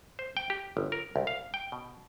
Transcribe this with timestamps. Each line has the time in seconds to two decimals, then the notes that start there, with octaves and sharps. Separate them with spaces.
0.19 C5
0.37 G5
0.50 G4
0.77 G1
0.92 A#4
1.16 C2
1.27 F5
1.54 G5
1.72 B2